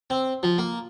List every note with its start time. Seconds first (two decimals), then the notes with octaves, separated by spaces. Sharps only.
0.10 C4
0.43 F3
0.58 A#3